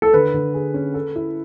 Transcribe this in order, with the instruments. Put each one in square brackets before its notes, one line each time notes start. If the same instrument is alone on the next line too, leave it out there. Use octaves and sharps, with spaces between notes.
[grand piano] A4
[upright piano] D3 [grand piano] B4
[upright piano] D3
G#4
C#4
A4
E4